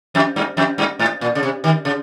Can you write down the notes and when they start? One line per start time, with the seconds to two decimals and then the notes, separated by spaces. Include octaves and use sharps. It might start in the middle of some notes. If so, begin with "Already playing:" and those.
0.15 F2
0.36 G2
0.57 F2
0.78 G2
0.99 G#2
1.21 A#2
1.35 C#3
1.43 C3
1.64 D#3
1.85 C#3